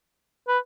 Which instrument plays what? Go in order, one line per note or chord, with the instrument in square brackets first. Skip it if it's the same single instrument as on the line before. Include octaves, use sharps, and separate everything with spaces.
[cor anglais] B4